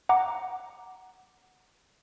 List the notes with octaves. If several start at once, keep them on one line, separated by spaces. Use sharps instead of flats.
F#5 A#5 D6